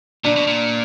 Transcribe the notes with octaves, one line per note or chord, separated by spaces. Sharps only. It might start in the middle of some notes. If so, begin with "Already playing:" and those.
A#2 D4
B2
A#2